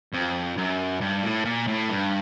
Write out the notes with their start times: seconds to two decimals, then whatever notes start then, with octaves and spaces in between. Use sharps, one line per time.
0.13 F2
0.57 F#2
1.01 G2
1.24 A2
1.45 A#2
1.67 A2
1.90 G2